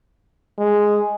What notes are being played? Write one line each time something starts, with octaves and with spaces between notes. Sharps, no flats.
G#3